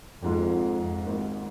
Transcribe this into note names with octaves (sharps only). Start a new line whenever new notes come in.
G#1 F2 G#2 F3 G#3
G#1 G#2 D#3 G#3 D#4